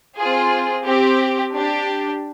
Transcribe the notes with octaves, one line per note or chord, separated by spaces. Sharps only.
C4 F4 G#4
C4 G4
D4 G4